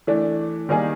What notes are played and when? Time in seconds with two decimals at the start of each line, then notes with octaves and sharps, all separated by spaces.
0.07 E3 A3 D4
0.69 D#3 G3 A#3 D#4 G#4